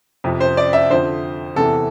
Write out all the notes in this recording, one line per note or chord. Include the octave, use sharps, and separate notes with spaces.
F2 C3 F3
C5
D5
E5
F2 D3 F3 C5
E2 C3 E3 A4